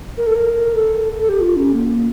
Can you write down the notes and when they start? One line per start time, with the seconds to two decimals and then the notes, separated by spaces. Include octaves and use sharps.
0.17 A#4
0.26 A4
0.35 A#4
0.75 A4
1.19 A4
1.29 G4
1.41 F4
1.56 C#4
1.73 A#3